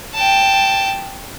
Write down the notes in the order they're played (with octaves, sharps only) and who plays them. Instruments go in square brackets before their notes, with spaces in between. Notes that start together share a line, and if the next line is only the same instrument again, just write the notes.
[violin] G5 A5